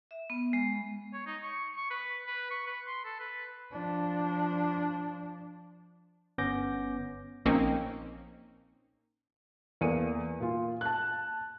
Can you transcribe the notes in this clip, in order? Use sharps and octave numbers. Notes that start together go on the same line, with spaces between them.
E5
B3
G#3
C#5
D#4
C#6
C#6
B4
B4
C#6
B4
C6
A4
B4
F3 D4
G1 B3 C#4 D6 G6 A#6
A#1 A#3 C4 C#4 D#4
E2 A#3 A4 D5 C#7 D#7
A#2 F4
A5 F#6